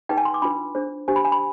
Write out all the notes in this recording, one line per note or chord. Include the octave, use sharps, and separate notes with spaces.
D#4 G#4 B4 G5
G#5
C6
D6
D4 F4 B4 B5
D4 G#4 C5
D4 G4 C5 G#5
B5
G#5
B5